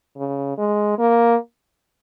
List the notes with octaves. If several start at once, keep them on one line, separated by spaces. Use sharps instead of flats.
C#3
G#3
A#3